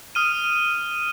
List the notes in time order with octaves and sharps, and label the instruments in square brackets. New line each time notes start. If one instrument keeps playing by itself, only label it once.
[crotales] D#6 F6 D#7